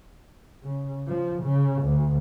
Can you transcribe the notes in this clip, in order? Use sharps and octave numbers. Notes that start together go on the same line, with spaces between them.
C#3
F3
C#3
D2